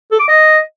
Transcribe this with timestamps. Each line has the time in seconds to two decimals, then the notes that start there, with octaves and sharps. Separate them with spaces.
0.11 A4
0.20 D6
0.28 D#5